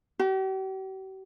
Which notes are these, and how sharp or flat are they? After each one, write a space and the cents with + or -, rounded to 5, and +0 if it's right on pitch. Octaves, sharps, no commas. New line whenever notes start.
G4 -45